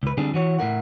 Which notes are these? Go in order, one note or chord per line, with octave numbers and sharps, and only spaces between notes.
C#2 B4
D3 G3 C4 D4 G#4
E3 F#4 C#5
A2 E4 A#4 F#5